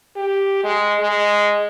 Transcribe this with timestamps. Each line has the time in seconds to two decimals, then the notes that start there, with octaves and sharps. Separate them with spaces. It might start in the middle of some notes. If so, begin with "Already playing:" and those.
0.16 G4
0.64 G#3
1.00 G#3